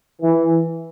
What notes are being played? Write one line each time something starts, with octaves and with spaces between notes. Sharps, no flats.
E3